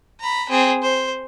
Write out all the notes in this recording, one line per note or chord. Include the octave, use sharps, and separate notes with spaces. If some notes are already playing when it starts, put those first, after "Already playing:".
A#5 B5
C4 G#4
C5